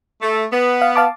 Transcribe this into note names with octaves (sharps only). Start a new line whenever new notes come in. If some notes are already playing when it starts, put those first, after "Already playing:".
A3
B3
F5
F5 A5 D6